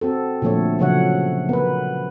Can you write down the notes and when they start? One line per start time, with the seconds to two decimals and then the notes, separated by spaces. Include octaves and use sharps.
0.01 C4 F#4 A4
0.42 A#2 D3 F3 A3 A4 C#5
0.79 C#3 F3 F#3 C#5 F#5
1.49 B3 A#4 B4